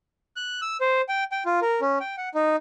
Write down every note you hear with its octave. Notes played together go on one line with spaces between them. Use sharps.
F#6
E6
C5
G5
G5
F4
A#4
C#4
G5
F#5
D#4